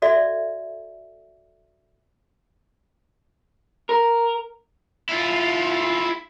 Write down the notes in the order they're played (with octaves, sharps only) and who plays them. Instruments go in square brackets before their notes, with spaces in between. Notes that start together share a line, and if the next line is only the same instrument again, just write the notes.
[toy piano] F#4 A4 D5 E5
[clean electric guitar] A#4
[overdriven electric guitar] E4 F4